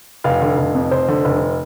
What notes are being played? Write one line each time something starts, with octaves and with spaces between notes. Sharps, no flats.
F1 F5
D3
F1
F2
F1 C5
D3
F1